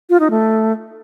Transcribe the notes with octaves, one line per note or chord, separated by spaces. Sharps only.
F4
D#4
A3